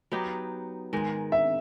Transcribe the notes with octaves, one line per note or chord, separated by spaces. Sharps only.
F#3 B3 D#4 G4
G#2 D#3 G#3
E5